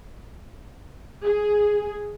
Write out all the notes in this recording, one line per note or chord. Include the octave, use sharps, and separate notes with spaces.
G#4